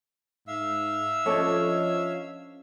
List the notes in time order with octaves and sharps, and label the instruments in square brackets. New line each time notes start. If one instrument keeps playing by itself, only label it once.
[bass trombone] G#2 [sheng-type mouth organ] E5 F5 E6
[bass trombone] F3 [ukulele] C#4 D4 A4 [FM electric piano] C#5 D#5 G#6